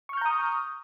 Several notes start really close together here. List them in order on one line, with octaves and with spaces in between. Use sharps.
C#6 F6 G6 A#5 D#6